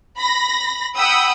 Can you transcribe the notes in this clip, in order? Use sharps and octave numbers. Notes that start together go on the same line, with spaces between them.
B5 A#6
F#5 G5 B5 D#6 E6